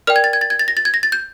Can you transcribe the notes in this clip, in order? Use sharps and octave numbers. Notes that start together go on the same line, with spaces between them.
A#4 D5 G5 F6
G#6
A6
G#6
A6
G#6
A6
A#6
A6
G#6
A#6
A6
G6